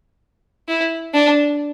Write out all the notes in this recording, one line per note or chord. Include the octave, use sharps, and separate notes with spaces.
E4
D4